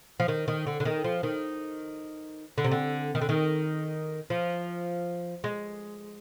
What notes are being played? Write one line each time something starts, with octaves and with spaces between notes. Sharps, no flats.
F3
D#3
D#3
D3
D3
D#3
F3
D#3
D3
C3
D3
D#3
D3
D#3
F3
G#3